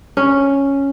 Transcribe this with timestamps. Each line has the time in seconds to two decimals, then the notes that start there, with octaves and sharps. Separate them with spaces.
0.17 C#4